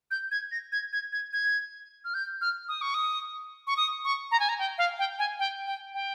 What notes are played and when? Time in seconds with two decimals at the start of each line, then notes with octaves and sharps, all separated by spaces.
0.11 G6
0.31 G#6
0.52 A#6
0.72 G#6
0.93 G#6
1.12 G#6
1.33 G#6
2.05 F6
2.14 G6
2.41 F6
2.68 D#6
2.82 C#6
2.94 D#6
3.67 C#6
3.77 D#6
4.05 C#6
4.31 A#5
4.40 G#5
4.49 A#5
4.59 G5
4.78 F5
4.99 G5
5.19 G#5
5.39 G5
5.67 G5
5.94 G5